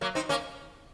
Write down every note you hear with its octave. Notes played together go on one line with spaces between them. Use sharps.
F#3 A#3
C4 D#4
A#3 C#4